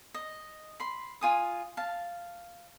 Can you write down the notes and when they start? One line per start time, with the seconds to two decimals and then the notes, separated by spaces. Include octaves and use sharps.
0.14 D#5
0.80 B5 C6
1.21 F4 G#5 D#6
1.77 F5 A5